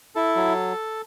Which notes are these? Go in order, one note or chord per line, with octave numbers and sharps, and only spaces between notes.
E4 A4
F#3